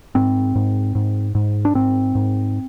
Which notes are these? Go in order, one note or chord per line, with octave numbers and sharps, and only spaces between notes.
G#2 C4
G#2
G#2
G#2
D4
G#2 C4
G#2